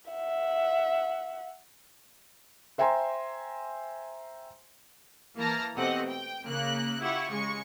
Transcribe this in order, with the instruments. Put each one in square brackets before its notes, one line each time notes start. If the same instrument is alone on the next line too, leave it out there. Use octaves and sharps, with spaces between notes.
[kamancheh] E5 F#5
[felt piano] C5 E5 G5 G#5 A#5 C6
[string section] E3 A#3 A5 A#5 F6
B2 A3 C4 G4 D#5 F#5
G5
C#3 A#3 F#6
E4 F4 G4 F#5 C#6
C#3 G#3 C#6 C#7